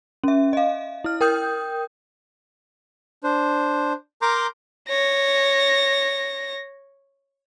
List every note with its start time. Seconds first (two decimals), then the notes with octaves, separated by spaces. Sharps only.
0.24 C#4 E5
0.53 D#5 F5
1.04 E4 F6
1.21 A#4 G5 D#6 G6
3.24 D4 C5
4.22 A#4 A#5 C6 D6 G6
4.88 C#5 A#6